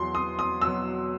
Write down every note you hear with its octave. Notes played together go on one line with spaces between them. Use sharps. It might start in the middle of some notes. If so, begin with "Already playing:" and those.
Already playing: E2 B2 F#3 C6
D#6
D#6
B2 F#3 E6